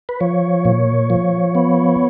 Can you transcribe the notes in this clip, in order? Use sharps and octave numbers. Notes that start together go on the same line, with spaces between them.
B4
F3 C#5
A#2
F3
B3